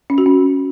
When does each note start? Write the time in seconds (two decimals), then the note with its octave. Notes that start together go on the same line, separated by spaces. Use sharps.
0.10 C#4
0.18 F#4
0.26 C#4